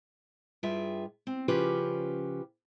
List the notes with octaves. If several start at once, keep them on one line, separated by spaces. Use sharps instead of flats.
G2 F4 G#4 E5 G5
C4
C#3 F3 C#4 F4 G4 B4